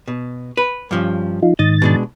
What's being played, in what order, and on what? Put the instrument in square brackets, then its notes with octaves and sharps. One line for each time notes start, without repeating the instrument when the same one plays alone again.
[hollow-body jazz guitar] B2
B4
G2 F3 C#4
[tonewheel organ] F3 D#4 F4
[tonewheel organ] G#2 D#3 A6 [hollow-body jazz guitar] D#5
[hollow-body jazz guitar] B2 G#3 D4